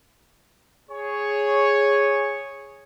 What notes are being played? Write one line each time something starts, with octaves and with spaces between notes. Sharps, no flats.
G#4 C#5